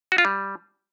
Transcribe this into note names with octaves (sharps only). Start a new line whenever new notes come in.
F#4
F4
G3